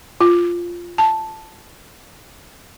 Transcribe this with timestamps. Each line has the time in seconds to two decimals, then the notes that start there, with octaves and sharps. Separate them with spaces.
0.21 F4
0.98 A5